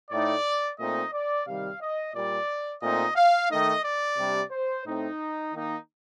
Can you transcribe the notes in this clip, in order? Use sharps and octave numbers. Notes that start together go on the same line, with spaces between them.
A2 A3 D#4 D5
A#2 A3 C4 D#4 D#5
D5
C3 D#3 G3 F5
D#5
A#2 G3 A#3 D5
A#2 A3 C4 D#4 D#5
F5
D#3 A3 D#4 D#5
D5
C3 G3 D4
C5
A2 A3 C4 D#4
D#3 A#3 D#4